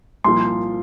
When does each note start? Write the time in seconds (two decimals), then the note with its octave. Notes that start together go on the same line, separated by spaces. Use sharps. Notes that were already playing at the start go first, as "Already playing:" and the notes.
0.24 C2 A#2 F3 C6